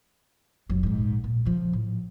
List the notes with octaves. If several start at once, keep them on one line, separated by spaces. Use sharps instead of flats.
F1 F#3
A#1 G#2
A#2
C#3 F3
A2